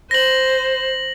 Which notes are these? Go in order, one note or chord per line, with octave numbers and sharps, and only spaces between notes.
C5 A#6 F#7